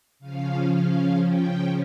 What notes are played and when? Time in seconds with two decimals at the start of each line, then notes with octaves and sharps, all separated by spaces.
0.19 C#3 F3 C#4 F5
0.71 F5
1.22 G5